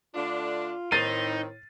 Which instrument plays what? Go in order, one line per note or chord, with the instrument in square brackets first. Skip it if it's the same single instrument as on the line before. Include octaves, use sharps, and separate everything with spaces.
[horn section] D3 A3 D4 [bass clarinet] F4
[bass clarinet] A2 [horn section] D#3 C4 [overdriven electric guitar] D#4 [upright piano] A6 C7 D#7